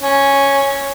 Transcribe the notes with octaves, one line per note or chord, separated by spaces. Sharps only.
C#4